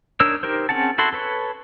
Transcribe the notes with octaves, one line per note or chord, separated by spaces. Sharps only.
D4 D#4 A#4 C#5 E6
D#4 G4 A#4 C5
C4 C#4 G#4 F#5 A5
E4 F#4 A4 C6
A4 B4 C#5